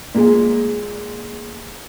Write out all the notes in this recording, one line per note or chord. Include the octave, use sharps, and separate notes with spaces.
A#2 G#3